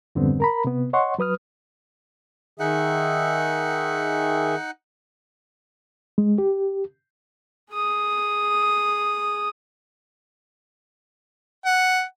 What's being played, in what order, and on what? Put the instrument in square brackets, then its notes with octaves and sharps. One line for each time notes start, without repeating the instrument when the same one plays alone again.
[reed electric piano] F2 G#2 D3 G3 B3 C4
A#4 A#5 B5
C3 B3
C#5 D#5 F#5 C6 C#6
F#3 B4 D#6 F6
[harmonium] D#3 G#4 E5 [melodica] D#4 F#5
[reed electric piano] G#3
G4
[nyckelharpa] G#4 D#6
[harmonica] F#5